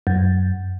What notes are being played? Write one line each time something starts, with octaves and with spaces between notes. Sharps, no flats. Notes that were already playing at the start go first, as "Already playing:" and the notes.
F#2